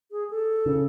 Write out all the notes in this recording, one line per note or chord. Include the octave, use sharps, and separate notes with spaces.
G#4
A4
C#3